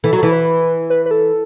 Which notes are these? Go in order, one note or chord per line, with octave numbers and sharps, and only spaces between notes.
E3 A4
F#3
E3 A4
B4
B4
B4
A4